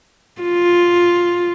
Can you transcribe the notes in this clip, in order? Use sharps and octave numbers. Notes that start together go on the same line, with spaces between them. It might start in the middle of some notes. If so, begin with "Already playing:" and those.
F4